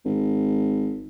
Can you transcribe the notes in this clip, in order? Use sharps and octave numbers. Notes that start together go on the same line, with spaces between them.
G#1